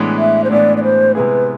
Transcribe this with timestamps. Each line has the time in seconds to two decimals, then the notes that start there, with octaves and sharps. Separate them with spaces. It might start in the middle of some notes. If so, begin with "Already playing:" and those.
Already playing: A2 E3 G#3 B3 D4
0.18 E5
0.44 C5
0.51 A2 E3 G#3 B3 D4 D5
0.77 D5
0.83 C5
1.15 C3 G#3 B3 E4 G#4 B4